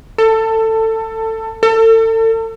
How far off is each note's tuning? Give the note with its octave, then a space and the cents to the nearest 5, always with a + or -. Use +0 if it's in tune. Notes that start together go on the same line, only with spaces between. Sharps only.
A4 +20
A4 +35